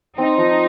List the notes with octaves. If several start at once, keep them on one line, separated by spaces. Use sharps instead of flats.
C4 D#4
F3